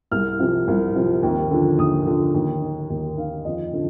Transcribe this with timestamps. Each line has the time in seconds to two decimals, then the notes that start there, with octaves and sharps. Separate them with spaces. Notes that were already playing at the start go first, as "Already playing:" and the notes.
0.11 C2 F6
0.39 C3 F3
0.68 C2
0.95 C3 F3
1.23 D#2
1.51 D3 F3
1.78 D#2 D#6
2.07 D3 F3
2.34 D#2
2.62 D#3
2.90 D#2
3.18 D#3 F5
3.45 F2 D#5
3.73 D3 F3